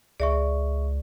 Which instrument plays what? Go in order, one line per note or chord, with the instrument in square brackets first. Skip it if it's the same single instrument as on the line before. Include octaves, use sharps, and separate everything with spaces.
[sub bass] C#2 [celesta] G#4 E5 C#6 [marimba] D5